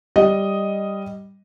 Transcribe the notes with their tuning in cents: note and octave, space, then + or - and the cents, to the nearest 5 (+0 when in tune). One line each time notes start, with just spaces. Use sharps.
G3 +0 D#5 +0